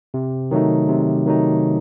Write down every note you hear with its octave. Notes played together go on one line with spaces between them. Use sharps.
C3
D#3 F#3 A3 D#4
C3
D#3 F#3 A3 D#4